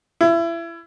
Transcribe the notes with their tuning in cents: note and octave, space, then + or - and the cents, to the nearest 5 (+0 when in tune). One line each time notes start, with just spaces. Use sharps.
E4 +30